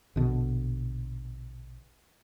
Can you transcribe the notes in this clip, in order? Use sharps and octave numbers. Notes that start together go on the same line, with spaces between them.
A#1 B2 D3